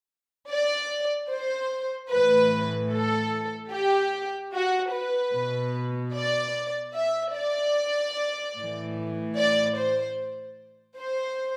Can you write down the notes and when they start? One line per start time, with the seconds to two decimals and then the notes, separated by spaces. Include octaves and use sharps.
0.50 D5
1.30 C5
2.11 A2 E3 B4
2.92 A4
3.72 G4
4.54 F#4
4.93 B4
5.33 B2
6.14 D5
6.95 E5
7.35 D5
8.56 A2 E3
9.37 D5
9.78 C5
10.99 C5